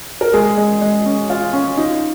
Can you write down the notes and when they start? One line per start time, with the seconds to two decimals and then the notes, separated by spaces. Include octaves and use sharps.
0.21 A#4
0.33 G#3 G#4
0.57 G#3
0.81 G#3
1.06 C#4
1.30 F4
1.53 C#4
1.77 D#4 F4